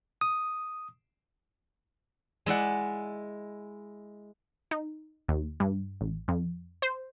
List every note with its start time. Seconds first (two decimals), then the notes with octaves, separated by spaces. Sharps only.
0.21 D#6
2.46 G#3 E4 D5 F#5
4.71 D#4
5.28 D#2
5.60 G2
6.01 A1
6.28 F2
6.82 C5